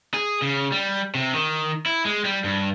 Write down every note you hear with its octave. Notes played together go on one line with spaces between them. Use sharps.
G#4
C#3
G3
C3
D#3
E4
G#3
G3
G2